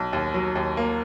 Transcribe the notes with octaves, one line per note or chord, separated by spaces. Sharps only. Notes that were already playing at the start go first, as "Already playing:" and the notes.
Already playing: B1
D#2
F#3
D#2
A#3